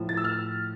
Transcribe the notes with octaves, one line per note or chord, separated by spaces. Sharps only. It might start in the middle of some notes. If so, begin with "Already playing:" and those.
Already playing: A2 F3
A6
E6
F6